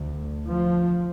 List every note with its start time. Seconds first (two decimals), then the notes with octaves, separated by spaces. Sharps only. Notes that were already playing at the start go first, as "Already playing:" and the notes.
Already playing: D2
0.47 F3